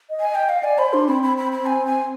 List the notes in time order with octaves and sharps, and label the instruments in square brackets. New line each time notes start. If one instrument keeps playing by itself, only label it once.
[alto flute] D#5
[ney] G#5
[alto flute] D#5
[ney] G5
[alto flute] D#5 [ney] F5
[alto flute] D5 [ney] G#5
[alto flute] C5 [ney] B5
[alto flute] D4 [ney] C6
[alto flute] C4 [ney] B5
[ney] B5
B5
B5
G#5
G#5